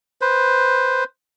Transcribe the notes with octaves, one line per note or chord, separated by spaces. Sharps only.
B4 C5